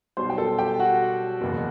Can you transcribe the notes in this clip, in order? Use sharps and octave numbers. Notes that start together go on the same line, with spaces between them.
B1 B2 G3 C5 C6
G5
A4 A5
G4 G5
F#4 F#5
F#1 E2 B2